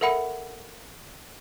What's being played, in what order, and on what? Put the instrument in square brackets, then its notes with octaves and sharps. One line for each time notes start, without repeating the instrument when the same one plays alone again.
[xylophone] A4 A#4 E5 F#5 B5 C#7